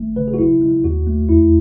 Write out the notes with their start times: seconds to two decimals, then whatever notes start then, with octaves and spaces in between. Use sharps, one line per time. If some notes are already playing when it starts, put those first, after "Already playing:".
Already playing: G#1 A3
0.16 C#3 B4
0.28 G#4
0.34 F#4
0.38 B1 E4
0.61 G#3
0.84 D#2 F#4
1.07 A3
1.29 E2 E4